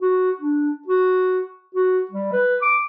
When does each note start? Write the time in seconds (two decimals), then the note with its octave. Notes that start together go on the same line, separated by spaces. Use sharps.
0.01 F#4
0.40 D4
0.88 F#4
1.75 F#4
2.11 G3
2.33 B4
2.62 D6